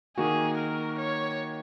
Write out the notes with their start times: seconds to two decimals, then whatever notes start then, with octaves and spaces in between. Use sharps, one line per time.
0.18 D#3 A#3 F#4 G#4
0.58 A#4
0.99 C#5